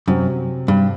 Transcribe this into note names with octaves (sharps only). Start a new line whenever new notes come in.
F#2 C3 F#3 C4
G2